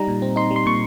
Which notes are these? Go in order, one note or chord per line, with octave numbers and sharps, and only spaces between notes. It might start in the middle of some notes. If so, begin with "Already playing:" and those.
Already playing: G3 D#4 A#5
A#2
C4
D#4 C6
G3
C6
A#2 C#6